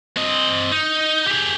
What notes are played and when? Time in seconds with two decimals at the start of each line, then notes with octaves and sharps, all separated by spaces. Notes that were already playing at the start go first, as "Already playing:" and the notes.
0.17 C4 D#5
0.72 D#4
1.27 G4 G#4